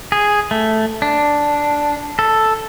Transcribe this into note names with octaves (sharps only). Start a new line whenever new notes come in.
G#4
A3
D4
A4